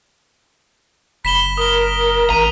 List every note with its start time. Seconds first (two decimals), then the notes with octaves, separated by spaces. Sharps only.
1.25 F#1 B5 B6 E7 G7
1.58 A#4 D#6 G7
2.30 A1 A#5 D#7